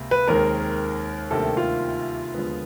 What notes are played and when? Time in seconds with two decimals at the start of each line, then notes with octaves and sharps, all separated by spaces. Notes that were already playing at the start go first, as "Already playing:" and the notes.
Already playing: C#2 C3 A#3
0.11 B4
0.28 D#2 D#3 G#3 C4 A#4
1.31 D2 C3 D#3 G3 A#3 A4
1.57 F4
2.34 D#2 D3 F3 G#3 B3